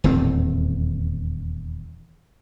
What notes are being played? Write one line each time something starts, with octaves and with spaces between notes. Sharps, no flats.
D#1 E2 A2 C4